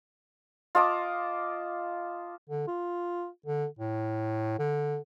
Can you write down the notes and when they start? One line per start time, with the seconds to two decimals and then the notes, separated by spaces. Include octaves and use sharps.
0.75 F4 D#5 A5 D6
2.50 D3
2.67 F4
3.46 D3
3.79 A2
4.59 D3